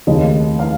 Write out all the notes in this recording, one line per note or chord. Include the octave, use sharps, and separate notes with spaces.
F1 D#2 C#3 D#5
F5